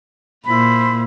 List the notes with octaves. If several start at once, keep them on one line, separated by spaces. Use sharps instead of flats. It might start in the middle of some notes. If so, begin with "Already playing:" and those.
A#2 E4 C5 B5